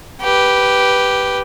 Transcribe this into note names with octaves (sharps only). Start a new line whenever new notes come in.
G4 B4